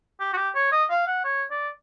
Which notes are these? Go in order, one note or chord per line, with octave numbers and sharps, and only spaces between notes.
G4
F#4
G4
C#5
D#5
F5
F#5
C#5
D5